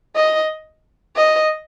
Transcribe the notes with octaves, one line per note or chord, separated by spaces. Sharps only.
D#5
D#5